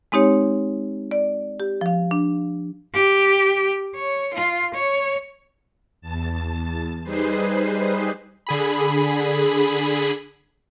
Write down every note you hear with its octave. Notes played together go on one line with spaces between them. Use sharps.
G#3 C4 D#4 G4 C#5
D5
G4
F3 F5
D4
G4
C#5
F4
C#5
E2 A5
G3 D#4 G#4 B4 C5 C7
D3 G#4 B5